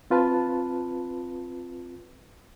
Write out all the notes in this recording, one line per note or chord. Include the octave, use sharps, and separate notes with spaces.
C4 F4 B4 A5